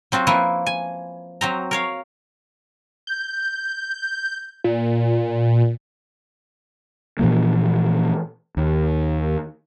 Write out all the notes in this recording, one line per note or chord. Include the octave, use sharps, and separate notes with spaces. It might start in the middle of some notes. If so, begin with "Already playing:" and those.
F#3 C4 F4 F#4
F3 A#3 E4 B4
G#5
F#3 C4 A#5
A#4 C#5 F5
G6
A#2
A#2 E3 F3 A#3
D#2